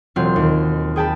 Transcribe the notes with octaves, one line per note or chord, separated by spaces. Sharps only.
E1 F#3 C4 F4 C6
D#2
G#4 G5 A5 B5